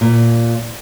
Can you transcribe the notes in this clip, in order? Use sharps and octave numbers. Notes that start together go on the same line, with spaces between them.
A#2